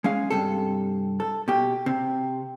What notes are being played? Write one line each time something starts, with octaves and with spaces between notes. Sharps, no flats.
G#3 C#4 F5
G2 C3 A4
A4
B2 G4
C3